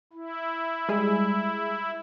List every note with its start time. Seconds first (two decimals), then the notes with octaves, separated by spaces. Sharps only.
0.13 E4
0.88 G3 G#3 G#4